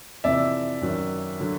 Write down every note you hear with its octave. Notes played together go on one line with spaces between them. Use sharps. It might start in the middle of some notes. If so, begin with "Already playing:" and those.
F2 C3 E3 D5 E5
F#2 D#3 F#3
D3 F#3